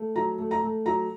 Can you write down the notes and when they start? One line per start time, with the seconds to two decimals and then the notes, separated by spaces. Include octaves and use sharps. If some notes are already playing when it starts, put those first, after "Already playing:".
Already playing: A3
0.16 F#3 A#5
0.39 A3
0.51 A#5
0.63 A3
0.86 F#3 A#5